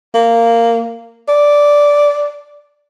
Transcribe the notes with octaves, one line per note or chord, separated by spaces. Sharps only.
A#3
D5